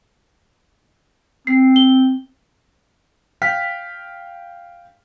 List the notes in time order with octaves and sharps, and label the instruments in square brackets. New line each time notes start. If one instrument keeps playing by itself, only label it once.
[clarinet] C4 [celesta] C7
[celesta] G7
[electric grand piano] F5 G5 F6 B6